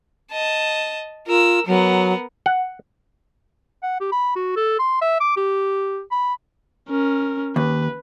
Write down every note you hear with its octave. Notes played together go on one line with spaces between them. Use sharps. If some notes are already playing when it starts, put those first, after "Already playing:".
D#5 A5
F4 A#4 E6
F#3 B3 A#4
F#5
F#5
G4
B5
F#4
A4
C6
E5
D6
G4
B5
C#4 A#4
D#2 B4